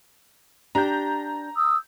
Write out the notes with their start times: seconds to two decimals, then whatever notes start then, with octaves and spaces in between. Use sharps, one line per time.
0.75 D4 G4 A#5 G6
1.56 D#6 E6